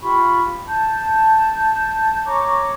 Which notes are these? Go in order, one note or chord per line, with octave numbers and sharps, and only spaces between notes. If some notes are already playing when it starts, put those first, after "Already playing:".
F4 G4 B5 C#6
A5 G6
C#5 A#5 C#6 D6